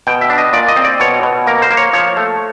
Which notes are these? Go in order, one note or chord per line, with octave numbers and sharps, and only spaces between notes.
B2 G5
E5
D4
D#5
A#2 D5
D#5
C4
D5
B2 C#5
B2
A#3 A#4
C5
A#3
C#5
F3 C#5
A3